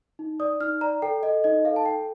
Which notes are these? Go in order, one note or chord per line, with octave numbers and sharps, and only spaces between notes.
D#4
D5 D#6
D#4 F6
D5 A#5
A4 G5
A4 D#5
D#4 D#5
A4 F5
A5
A4 G5